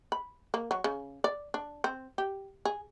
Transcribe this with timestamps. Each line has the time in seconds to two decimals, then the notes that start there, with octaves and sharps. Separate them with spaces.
0.12 B5
0.54 A#3
0.71 F#3
0.84 C#3
1.24 D5
1.54 D4
1.84 C4
2.18 G4
2.65 G#4